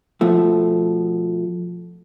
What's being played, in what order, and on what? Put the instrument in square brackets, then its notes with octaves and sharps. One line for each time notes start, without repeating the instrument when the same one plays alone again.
[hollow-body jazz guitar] B2 F3 A3